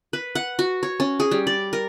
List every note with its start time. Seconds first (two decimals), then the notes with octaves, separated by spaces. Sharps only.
0.13 B4
0.35 F#5
0.59 F#4
0.83 C#5
1.00 C#4
1.20 G#4
1.31 G3
1.47 D5
1.73 A#4